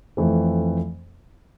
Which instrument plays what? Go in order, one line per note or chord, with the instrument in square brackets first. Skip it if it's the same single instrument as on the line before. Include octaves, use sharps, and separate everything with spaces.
[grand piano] F2 E3 A3 C4